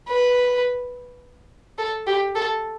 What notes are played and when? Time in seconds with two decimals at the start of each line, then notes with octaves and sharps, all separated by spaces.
0.08 B4
1.79 A4
2.07 G4
2.35 A4